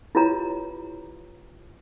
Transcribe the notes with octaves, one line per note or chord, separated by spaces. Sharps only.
E4 F4 G4 B4 C#5 A#5